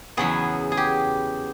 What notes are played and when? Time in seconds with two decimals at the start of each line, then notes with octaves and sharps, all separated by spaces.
0.17 E2 C#3 F#3 B3 G#4
0.72 G#4
0.77 G4